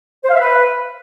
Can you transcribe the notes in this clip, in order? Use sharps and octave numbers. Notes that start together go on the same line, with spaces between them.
C5
F5
E5
B4